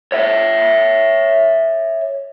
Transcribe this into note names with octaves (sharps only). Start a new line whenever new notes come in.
C#5 E5